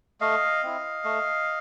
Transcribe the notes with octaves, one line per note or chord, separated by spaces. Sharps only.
A3 D#5 F5
C4 E4
A3